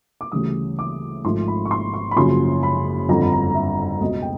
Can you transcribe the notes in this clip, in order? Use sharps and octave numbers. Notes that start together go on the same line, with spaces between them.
D6
D2 C#3 E3 G3 D#6
D6
G#1 G#2 F3 A3 C6
B5
C#6
C6
C#6
B5
F#1 F#2 C#3 F3 C6
B5
G1 F2 D3 F3 A#5
B5
A#5
E5
C#2 B2 G#3 D#5
G5